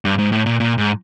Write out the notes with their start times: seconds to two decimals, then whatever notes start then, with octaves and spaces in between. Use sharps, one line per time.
0.05 G2
0.19 G#2
0.32 A2
0.46 A#2
0.60 A#2
0.78 G#2